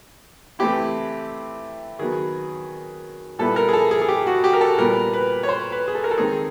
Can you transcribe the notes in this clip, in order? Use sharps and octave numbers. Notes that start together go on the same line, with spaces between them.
E3 A3 C4 E4 G4
D#3 F#3 B3 G#4
A#2 G3 B3 E4 A4
A#4
G#4
A4
G#4
G#4
G4
F#4
G4
A#4
A4
A#2 G3 B3 A#4
B4
C#5
C5
B4
G#4
A4
A#4
A4
D#3 G#3 C4 D#4 G#4